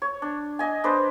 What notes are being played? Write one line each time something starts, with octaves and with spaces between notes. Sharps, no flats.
C#5
D4
D#5 G#5
D4 B4 C5